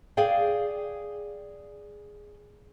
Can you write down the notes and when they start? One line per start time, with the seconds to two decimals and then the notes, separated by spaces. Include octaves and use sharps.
0.17 G#4 D5 F5 G5